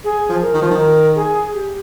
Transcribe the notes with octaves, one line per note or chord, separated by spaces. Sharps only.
G#4
F3
A#4
D#3
F3
D#3
A#4
G#4
G4